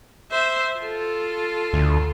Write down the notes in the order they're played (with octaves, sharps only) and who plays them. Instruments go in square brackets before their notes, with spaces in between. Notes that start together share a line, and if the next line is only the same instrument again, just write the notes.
[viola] C5 E5
F4 A4
[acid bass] D2